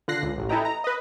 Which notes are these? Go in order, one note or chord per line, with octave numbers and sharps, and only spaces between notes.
D3 F4 F#6 A#6 C7
C#2
A1
E4 A4 B4 D#5 G5 A#5
A#5
B4 D#5